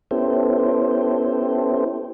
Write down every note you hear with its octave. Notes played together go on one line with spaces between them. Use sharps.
B3 C#4 E4 G4 A4 C5